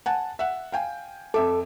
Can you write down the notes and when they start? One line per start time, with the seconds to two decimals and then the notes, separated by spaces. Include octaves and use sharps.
0.06 F#5 G#5 A5
0.39 E5 F#5
0.72 F5 G5 G#5
1.34 F2 A4 E5 D6